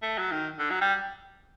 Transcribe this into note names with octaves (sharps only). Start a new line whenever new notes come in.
A3
F#3
D#3
D3
F#3
G3